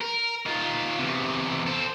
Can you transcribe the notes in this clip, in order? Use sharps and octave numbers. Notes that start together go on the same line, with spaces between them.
A#4
D#3 F4
E2 C3
A4 C5